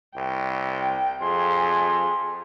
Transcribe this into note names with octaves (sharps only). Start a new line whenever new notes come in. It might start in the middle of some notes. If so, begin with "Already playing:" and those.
C2 G5
F2 G#4 C6